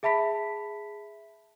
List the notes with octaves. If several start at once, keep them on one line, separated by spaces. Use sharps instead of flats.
G#4 E5 A5 B5 B6